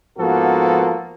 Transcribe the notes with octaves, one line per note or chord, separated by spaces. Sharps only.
G#2 F3 A#3 B3 F#4 A4